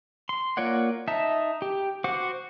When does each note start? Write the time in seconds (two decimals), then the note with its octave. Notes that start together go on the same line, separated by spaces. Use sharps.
0.29 C6
0.57 A#3 F4 C#5 D5 F#5
1.08 D#4 E5 A5
1.62 G4
2.04 F#4 C5 F#5 D6